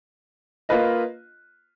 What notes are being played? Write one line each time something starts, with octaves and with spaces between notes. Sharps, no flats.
A#3 F4 B4 D#5